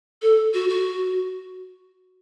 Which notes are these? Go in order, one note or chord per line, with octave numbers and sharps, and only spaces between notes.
A4
F#4
F#4